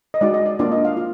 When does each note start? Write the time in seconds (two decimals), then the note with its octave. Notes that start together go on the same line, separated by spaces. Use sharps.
0.14 D#5
0.21 G#3 D#4 F#4 D5
0.34 D#5
0.46 D5
0.59 A#3 D4 F4 D5
0.72 D#5
0.85 F5
0.97 F4